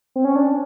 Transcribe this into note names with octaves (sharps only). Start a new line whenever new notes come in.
C4
C#4
D4